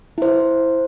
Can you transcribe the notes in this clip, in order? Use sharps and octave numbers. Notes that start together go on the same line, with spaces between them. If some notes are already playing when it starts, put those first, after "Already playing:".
E4 C5